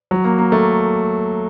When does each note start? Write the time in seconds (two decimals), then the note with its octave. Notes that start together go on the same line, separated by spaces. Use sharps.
0.11 F#3
0.24 A#3
0.38 A#3
0.52 A3